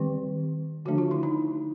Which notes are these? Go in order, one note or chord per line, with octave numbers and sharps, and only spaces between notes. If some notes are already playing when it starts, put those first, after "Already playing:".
Already playing: D#3 G3 C4 G4
D3 F3 A3 D4 F#4
F4
E4
D#4